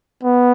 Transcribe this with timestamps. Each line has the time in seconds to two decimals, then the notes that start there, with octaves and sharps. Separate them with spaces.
0.23 B3